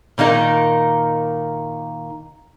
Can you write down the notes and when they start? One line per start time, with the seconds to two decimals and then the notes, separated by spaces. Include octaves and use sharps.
0.18 A#2 D#3 A#3 D#4 A#4